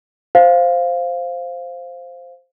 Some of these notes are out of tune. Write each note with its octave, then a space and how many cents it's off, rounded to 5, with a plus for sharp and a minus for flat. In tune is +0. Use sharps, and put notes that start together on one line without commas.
C5 +0 F5 +0